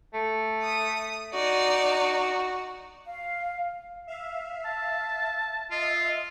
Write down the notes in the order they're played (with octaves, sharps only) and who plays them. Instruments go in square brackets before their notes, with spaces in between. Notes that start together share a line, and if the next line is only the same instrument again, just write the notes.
[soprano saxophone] A3
[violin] D#6
[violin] D#4 D5 [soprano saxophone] F#4
[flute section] F5
[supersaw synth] E5 F5
[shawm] A5
[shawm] F4 [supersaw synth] D#5 E5